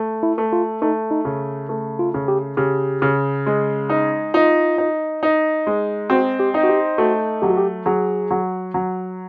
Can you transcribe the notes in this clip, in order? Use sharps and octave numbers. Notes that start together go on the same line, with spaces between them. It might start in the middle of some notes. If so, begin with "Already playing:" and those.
Already playing: A3
E4
A3
F4
A3 D#4
D#4
C#3
A3
F4
C#3
G4
C#3 G4
C#3
G#3
D#4
D#4 F4
D#4
D#4
G#3
C4 F#4
G4
D#4
F#4
G4
A3 F#4
F#3 G4
F#4
G4
F#3 G#4
F#3
F#3